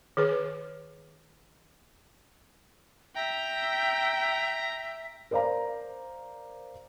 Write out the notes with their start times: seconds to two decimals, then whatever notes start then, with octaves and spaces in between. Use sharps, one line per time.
0.17 D#3 G#4 B4
3.15 E5 G5 A#5
5.31 A#4 C5 D5 F5 A#5